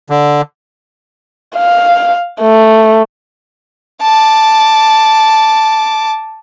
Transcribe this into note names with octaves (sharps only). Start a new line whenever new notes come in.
D3
F5
A3
A5 D6